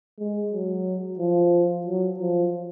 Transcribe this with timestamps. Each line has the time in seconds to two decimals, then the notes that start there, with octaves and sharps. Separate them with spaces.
0.19 G#3
0.53 F#3
1.19 F3
1.86 F#3
2.19 F3